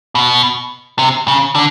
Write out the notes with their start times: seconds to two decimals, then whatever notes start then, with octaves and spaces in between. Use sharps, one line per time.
0.15 B2
0.99 C3
1.28 C#3
1.55 D3